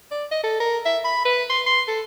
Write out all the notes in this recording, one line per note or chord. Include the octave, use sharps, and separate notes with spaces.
D5
D#5
A4
A#4
E5
B5
B4
C6
C6
A4